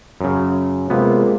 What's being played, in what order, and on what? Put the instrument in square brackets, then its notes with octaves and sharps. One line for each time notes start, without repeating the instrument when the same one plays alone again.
[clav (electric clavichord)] F#2 C#3
[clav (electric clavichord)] C3 B3 [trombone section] G#3 A#3 F4